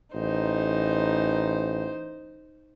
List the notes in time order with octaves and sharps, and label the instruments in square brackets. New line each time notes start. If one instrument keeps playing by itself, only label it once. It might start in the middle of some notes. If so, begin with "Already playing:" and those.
[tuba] A1 [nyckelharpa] D#4 C5